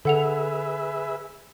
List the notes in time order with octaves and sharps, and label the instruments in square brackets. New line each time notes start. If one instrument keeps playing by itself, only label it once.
[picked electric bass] D3 [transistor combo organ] G#4 B4 E5 [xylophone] A4 F#5 F7